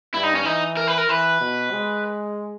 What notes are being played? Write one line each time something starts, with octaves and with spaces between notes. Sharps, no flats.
G2 E4
D#4
C#4
E3 D#4
A#4
B4
A#4
E3 B4
B2
G#3